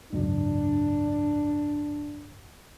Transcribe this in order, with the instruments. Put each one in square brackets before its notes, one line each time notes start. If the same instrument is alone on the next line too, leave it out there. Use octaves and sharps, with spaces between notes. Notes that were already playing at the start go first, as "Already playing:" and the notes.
[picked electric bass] G#1 C#2 F#2 [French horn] D4